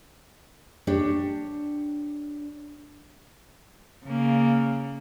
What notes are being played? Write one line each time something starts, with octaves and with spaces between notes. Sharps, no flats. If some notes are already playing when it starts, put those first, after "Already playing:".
D4 G4 C#5
C#3 A#3